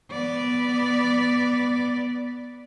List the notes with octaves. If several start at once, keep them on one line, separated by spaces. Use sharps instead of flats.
B3 D5